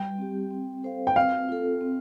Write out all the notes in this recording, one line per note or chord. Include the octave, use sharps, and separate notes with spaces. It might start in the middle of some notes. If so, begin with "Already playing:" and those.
Already playing: G3 G5
C4 G4
C4
A4 C5 F5
G5
C4 F5
F4 A4
C4